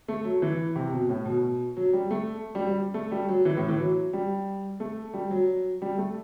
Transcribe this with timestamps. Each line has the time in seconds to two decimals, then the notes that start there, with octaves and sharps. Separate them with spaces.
0.08 A3
0.24 F#3
0.42 E3
0.76 C3
0.92 B2
1.09 A2
1.26 B2
1.77 F#3
1.93 G3
2.11 A3
2.55 G3
2.67 G3
2.94 A3
3.12 G3
3.28 F#3
3.45 E3
3.57 A2
3.68 E3
3.79 F#3
4.13 G3
4.80 A3
5.14 G3
5.31 F#3
5.82 G3
5.98 A3